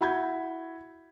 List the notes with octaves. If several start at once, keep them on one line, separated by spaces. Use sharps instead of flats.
E4 F#4 B5 G6 G#6